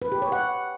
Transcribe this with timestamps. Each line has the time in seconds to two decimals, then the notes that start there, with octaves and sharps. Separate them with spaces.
0.02 B4
0.12 G4
0.22 C#5
0.32 F#5